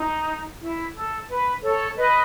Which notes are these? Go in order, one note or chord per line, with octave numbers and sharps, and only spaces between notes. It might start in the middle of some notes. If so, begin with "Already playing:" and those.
Already playing: D#4
E4
A4
B4
A4 C#5
B4 D#5